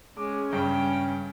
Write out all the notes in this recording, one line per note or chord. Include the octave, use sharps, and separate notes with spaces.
G#3 C#4 D6
G2 C#3 G5